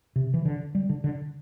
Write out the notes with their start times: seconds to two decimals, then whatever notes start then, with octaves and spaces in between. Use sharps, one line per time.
0.16 C3
0.34 E3
0.45 D3
0.75 G3
0.89 D3
1.04 D3